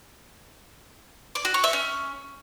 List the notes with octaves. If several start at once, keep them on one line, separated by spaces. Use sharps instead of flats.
D5
F#4
C#5
E5
C#4